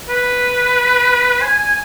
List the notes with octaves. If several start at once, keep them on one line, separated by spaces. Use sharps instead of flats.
B4
G#5